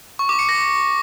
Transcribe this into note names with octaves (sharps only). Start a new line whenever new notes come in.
C#6
D6
C#7
A#6